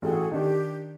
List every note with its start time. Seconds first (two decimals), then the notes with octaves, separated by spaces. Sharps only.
0.02 A1 F#4 G#4 A4 G5
0.32 D#3 D4 G4